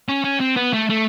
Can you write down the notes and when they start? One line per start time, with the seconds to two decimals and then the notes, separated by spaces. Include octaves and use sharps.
0.09 C#4
0.24 C#4
0.40 C4
0.56 B3
0.73 A3
0.89 A3